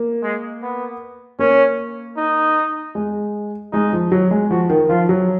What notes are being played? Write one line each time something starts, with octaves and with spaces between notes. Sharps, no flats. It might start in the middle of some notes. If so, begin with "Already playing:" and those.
Already playing: A#3
G#3
B3
A#3 C#4
D#4
G#3
G#3 D#4
F3
F#3
G#3
F3 F#4
D#3
F3 F4
F#3